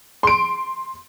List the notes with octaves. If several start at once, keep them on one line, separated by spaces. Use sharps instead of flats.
C6 D7